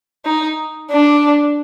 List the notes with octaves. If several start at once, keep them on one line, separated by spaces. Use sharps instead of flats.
D#4
D4